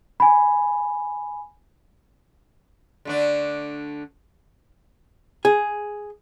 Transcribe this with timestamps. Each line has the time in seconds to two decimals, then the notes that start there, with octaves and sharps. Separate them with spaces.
0.20 G#5 B5
3.05 D3 A3 D4
5.45 G#4